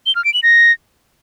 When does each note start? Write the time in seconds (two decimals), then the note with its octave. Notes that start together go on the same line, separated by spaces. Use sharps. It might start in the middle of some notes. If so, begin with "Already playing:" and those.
0.06 G7
0.15 F6
0.25 D7
0.34 F#7
0.43 A#6